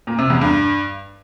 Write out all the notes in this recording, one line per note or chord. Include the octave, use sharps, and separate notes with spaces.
A#2
C3
E2
G2